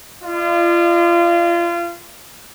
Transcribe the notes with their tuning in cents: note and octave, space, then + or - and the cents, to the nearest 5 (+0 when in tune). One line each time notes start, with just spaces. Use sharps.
F4 -30 D5 +45